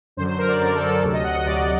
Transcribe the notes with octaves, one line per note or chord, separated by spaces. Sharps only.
F#2 D3 F#3 C5
C5
A#4
D5
F#2 D3 F#3 A#4
A4
A4
D2 C3 F#3
D#5
F#5
D#5
D2 C3 F#3 D5